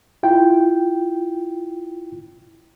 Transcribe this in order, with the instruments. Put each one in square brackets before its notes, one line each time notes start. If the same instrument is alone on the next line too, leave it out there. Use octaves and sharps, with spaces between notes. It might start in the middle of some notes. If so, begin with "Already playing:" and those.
[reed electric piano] E4 F4 G5